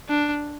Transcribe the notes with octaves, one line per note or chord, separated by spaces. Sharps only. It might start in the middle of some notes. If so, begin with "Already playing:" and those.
D4